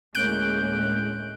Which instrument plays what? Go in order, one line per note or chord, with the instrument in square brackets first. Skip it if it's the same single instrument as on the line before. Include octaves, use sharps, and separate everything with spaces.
[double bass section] D2 A#3 C#4 [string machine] A2 G#3 [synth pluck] F#6 G6 D7